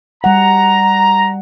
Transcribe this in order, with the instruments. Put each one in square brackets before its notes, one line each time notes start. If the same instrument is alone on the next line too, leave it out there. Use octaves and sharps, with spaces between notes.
[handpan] G3 F#5 [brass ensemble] A#5